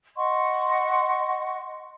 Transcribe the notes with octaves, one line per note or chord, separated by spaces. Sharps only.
D#5 F#5 C6 C#6